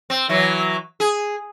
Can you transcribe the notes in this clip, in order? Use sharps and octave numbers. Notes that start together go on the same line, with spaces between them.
C4
E3 F#3
G#4